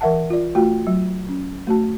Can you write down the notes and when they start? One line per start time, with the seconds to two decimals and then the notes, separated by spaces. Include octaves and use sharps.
0.01 E3 A#4 E5 F#5 A5
0.30 F4 D5
0.55 A3 F4 F#4 G5
0.87 F#3
1.29 C#4
1.67 A3 F#4 A5